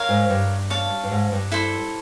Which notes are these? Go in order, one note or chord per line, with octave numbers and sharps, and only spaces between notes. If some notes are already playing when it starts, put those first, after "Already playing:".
Already playing: A#4 C#5 F5
G#2
G2
C#5 F5 A5
G2
G#2
G2
E4 A4 C5